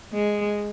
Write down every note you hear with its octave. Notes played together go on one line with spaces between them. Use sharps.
G#3